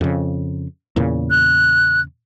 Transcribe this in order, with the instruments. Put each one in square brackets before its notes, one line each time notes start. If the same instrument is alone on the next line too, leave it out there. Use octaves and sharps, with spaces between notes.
[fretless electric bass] F2 C#3
E2 A#2 C#3
[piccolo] F#6